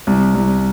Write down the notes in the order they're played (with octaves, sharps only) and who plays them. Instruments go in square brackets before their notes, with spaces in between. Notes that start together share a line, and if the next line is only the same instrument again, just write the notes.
[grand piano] C2
C2